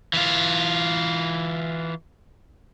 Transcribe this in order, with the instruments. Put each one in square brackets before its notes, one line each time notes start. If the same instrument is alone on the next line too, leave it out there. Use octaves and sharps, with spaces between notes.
[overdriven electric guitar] E3 F4